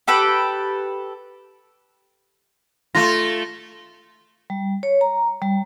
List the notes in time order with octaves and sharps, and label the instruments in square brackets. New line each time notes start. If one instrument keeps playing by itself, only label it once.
[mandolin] G4 A4 B4 G5
[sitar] A3 F4 [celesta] C6 A#6
[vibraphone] G3
C#5
A#5
G3